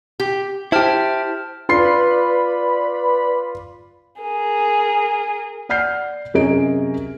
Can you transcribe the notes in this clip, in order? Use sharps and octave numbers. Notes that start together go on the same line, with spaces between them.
G4
E4 G4 C5 A5 F6
F4 B4 D5 B5 C6 C7
G#4 A#4
D5 F#5 F6 G6 C7
F#2 C3 G#4 A#4 D#5 D7